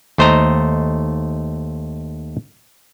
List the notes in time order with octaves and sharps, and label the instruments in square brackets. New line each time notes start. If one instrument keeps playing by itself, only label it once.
[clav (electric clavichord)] D#2 A3 C5 D#5 A#5